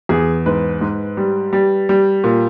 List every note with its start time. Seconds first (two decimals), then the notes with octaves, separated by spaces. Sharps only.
0.09 E2 G#4
0.46 G#2 B4
0.81 G#2
1.17 G3
1.53 G3
1.89 G3
2.24 A#2